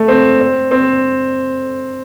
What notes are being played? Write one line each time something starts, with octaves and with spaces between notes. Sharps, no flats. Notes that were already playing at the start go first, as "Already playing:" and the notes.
Already playing: A3
C4
C4
C4